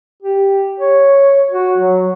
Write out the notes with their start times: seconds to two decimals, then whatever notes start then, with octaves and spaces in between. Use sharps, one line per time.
0.22 G4
0.79 C#5
1.51 F#4
1.77 F#3